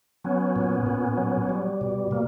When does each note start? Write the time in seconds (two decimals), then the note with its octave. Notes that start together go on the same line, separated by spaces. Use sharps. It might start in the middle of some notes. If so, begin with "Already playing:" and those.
0.24 F#3 B3 C#4
0.56 A#2
0.86 A#2
1.17 F#3
1.49 G3
1.81 B2
2.11 B2 A#3